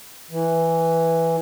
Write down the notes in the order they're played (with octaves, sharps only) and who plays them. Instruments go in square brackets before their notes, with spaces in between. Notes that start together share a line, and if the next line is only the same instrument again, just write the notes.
[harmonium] E3